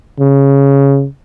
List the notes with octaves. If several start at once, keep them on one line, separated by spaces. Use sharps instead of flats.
C#3